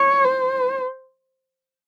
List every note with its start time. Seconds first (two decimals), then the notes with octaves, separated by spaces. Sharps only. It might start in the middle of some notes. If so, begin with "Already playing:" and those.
Already playing: C#5
0.25 C5